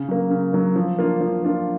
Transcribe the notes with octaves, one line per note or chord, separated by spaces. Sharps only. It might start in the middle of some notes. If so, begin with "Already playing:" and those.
Already playing: C#3
F#3 A#3
C#3
F#3 A#3
F3
A#3 D4 F4
F3
A#3 D4 F4